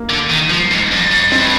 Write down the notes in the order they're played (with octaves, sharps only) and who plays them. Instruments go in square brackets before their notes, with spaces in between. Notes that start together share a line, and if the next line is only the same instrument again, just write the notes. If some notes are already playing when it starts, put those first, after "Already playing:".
Already playing: [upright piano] A#3
[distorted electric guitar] D3
D#3
F3
G#2
F2
F2
[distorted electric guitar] G2 [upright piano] C4